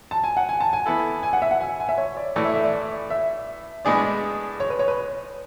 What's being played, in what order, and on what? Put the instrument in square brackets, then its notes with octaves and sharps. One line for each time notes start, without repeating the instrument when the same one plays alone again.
[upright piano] A5
G#5
F#5
G#5
A5
G#5
[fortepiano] E3 B3 E4 A4
[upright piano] G#5
F#5
E5
F#5
G#5
G#5
E5
C#5
D5
[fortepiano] A2 E3 A3 [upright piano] D5
[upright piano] E5
E5
D5
E5
[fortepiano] A2 G#3 B3 D4 G#4 [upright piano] D5
[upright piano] C#5
B4
C#5
B4